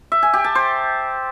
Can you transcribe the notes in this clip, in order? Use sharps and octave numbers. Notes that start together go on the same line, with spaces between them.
E5
G#5
G4
A5
C5